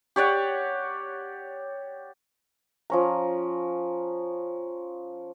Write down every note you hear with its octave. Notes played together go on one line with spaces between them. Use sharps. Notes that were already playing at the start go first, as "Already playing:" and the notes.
G4 C#5 D5 F#5
F3 C#4 A#5